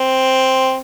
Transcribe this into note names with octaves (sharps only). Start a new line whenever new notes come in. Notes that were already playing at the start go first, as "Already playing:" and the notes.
Already playing: C4